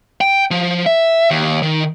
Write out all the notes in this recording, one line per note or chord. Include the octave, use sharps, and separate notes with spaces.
G5
F3
E5
D#2
D#3